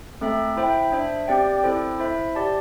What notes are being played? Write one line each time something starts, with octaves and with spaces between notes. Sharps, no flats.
A3 C4 A4 E5
E4 C5 E5 G5
D4 C5 E5
C4 G4 D5 G5
C4 E4 A4 C5
E4 C5 E5
G4 D5 A5